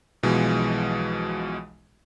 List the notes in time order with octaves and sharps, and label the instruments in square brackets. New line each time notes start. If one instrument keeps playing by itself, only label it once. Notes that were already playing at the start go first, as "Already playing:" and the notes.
[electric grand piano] B1 B2 E3 F3 G#3